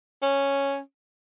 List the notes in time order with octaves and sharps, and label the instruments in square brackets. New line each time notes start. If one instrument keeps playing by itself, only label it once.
[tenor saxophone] C#4